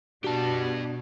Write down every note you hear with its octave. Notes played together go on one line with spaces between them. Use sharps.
B2 D4 F#4 G4 A5